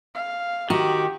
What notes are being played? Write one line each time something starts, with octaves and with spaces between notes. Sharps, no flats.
F5
D#3 F#4 G4